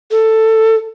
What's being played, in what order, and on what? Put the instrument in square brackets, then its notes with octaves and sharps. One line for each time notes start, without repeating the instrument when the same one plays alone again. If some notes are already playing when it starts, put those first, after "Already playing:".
[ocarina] A4